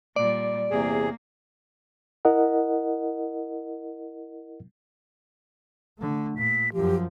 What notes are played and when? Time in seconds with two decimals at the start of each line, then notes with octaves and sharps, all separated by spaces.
0.16 A#2 G3 D5
0.71 E2 C3 A#3 G#4
2.25 E4 A#4 D#5 F#5
5.99 D3 A3
6.37 A#2 B6
6.73 F#2 F3 G4